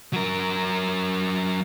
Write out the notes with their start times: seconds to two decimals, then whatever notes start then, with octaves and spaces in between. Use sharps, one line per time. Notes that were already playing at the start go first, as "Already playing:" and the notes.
0.13 F#3 A#4